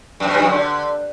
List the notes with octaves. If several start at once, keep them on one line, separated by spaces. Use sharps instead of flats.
F#2
B2
G2
F#2
D3